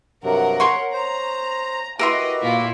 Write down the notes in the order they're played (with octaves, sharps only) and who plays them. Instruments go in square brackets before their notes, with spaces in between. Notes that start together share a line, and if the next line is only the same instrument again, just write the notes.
[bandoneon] G2 C3 F#3 [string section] A#4 F#5
[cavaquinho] C#5 C6 C#6
[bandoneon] C5 [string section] A#5
[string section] E4 B4 D#5 [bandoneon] F#4 G4 [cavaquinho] A#4 E5 C6
[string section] A#2 E4 F4